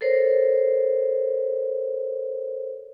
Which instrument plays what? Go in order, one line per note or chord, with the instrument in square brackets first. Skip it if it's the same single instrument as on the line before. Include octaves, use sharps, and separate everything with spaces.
[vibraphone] A4 A#4 C5 C#5